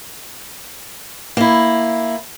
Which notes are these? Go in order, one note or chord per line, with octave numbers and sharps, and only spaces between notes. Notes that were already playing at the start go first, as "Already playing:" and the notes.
A#3 E4